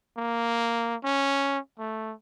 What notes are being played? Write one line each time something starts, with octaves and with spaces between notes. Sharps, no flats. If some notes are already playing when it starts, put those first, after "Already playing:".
A#3
C#4
A3